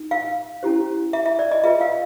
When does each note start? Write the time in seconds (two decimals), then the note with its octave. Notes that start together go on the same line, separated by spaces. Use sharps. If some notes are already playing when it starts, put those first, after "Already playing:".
Already playing: D#4
0.11 F5
0.63 C#4 E4 G4 C5
1.13 E5
1.26 E5
1.39 D5
1.51 D#5
1.64 F4 G#4 B4 E5
1.81 F5